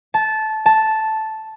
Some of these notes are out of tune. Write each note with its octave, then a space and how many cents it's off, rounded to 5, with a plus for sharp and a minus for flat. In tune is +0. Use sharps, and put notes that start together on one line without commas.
A5 -15
A5 -5